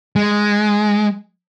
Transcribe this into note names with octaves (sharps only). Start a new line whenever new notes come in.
G#3